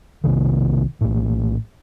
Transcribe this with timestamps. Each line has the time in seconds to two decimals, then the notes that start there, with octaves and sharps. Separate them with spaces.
0.24 B1 C3 D#3
1.01 A#1 A2